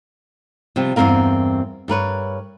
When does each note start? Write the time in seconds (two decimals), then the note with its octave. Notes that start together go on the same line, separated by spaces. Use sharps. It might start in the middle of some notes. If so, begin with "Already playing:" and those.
0.76 C3 F3 G3
0.96 E2 G2 E3 C4 A#4 F5
1.88 G2 A#4 B4 C#5